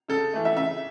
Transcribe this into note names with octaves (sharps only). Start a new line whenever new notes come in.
C#3 A4
E3 A3
E5
C#3 E5